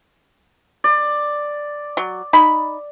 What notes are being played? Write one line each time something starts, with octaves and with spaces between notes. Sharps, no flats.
D5
F#3
D#4 B5